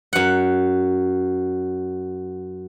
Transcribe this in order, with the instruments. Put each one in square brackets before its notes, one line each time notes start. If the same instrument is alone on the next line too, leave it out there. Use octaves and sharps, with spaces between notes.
[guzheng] F#2 F#5